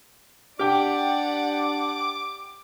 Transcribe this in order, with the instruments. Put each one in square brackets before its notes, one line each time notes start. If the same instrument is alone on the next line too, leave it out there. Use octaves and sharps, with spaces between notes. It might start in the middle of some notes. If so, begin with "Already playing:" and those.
[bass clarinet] D4 [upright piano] G4 G5 [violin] D5 F#5 [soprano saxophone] D6